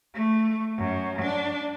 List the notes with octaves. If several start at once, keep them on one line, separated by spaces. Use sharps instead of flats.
A3
F#2
D4